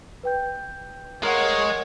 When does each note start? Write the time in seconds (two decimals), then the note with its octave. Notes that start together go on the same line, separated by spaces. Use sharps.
0.24 B4 G5 G6
1.23 G#3 A#4 C#5 F5 F#5